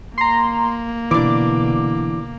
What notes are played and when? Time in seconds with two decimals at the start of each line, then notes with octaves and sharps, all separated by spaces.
0.18 A#3 A#5 C6
1.11 B2 D3 E3 D4 D6